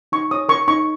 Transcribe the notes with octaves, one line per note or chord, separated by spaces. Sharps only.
D#4 C#6
C#5 D#6
A#4 C#6
D#4 C#6